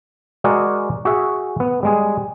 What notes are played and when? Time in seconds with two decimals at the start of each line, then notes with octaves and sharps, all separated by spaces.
0.44 G#3 F#4 G#4 A#4 D5 F#5
1.05 F#4 G#4 E5 F#5
1.60 B3
1.83 G3 G#3 G#4